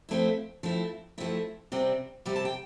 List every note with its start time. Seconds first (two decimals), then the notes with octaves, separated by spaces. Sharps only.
0.09 F3 A3 C4 E4
0.63 F3 A3 C4 E4
1.18 F3 A3 C4 E4
1.72 C3 G3 C4
2.26 C3 G3 C4
2.36 A5
2.45 G5